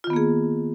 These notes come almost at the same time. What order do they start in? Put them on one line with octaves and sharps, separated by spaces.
F4 D#3 B3 A#3 G#4